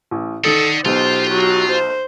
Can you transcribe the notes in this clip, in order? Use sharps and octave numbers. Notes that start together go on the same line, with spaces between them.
A1
D#3 A4 D5 F#5 D#6
B1 B2 F4 G4 C5
F#3
C5